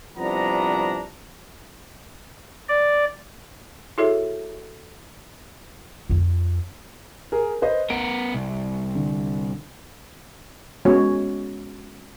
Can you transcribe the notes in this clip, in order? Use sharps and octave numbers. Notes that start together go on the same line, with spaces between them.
C2 F3 B3 D4 A#5
D5
E4 F#4 G#4 A4 C#5 E5
F2 F4
G#4 A#4
B4 C5 D#5
B3 A#4 D7
C2
D3
G#3 B3 C#4 F#4 C#5